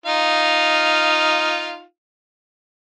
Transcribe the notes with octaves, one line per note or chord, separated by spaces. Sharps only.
D#4 F4 F5